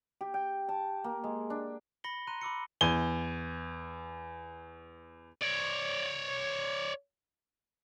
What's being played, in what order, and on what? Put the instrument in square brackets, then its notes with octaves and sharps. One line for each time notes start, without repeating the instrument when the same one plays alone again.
[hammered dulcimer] G4
G5
A5
A#3
G#3
D4
[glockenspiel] B5 A#6 C#7 G7
A#5 C6 F#6 D#7
B5 D6 E6 C#7
[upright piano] E2 G#5 G7
[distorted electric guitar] C#5 D5